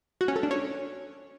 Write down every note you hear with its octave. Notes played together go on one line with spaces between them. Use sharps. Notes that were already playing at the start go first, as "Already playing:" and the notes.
F#4
C#4
A4
D4
C#4